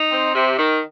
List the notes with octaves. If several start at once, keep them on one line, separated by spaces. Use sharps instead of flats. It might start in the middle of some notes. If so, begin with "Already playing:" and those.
Already playing: D#4
C4
C3
D#3